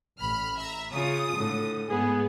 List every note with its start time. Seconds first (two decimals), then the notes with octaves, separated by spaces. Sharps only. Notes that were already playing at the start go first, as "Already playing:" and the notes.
0.19 A1 B5 F6
0.58 E5 A#5
0.92 C#3 F4 D#6
1.36 A2 D3
1.90 G#2 B3 G#4